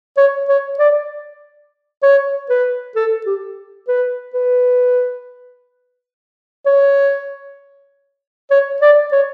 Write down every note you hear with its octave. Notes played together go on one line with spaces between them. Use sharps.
C#5
C#5
D5
C#5
B4
A4
G4
B4
B4
C#5
C#5
D5
C#5